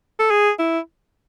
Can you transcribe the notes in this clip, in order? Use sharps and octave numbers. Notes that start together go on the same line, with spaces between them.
A4
G#4
E4